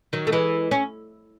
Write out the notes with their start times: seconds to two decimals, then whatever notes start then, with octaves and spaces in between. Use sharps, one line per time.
0.13 D#3 F#3
0.27 A3
0.32 E3 G#3
0.71 C#4